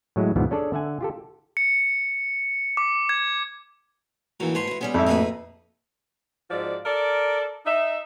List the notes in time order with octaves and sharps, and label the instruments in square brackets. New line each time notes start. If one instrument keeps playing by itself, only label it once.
[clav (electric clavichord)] A2 F#3 G#3 E4
D2 G#2 B2 E3 F3 B3
C#4 D4 G#4 A4 C#5 D5
D3 E5 F#5 G#5
F4 G4 A4
[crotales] C#7
D6
G#6
[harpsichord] A#1 E3 F#3 [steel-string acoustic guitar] A#5
[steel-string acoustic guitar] G#2 A5 [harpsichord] B4 C#5 C6
[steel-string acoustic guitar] E4 F#4
[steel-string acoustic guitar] G3 C#4 G#4 [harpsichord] B3
[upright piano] F2 E5 [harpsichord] G#2
[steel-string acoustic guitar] A2 A#3 F#4 [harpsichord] D#4 G#4 B4
[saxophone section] G#2 F3 F#4 D5
A4 A#4 D5
D#4 E5